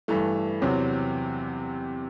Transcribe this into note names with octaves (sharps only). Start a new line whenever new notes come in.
G2 E3 A3
E2 C3 F#3 C4